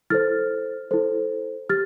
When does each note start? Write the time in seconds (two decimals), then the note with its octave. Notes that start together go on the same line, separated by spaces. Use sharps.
0.10 E4 A4 C5 F6 A6
0.91 E4 A4 C5
1.70 G4 F6 A6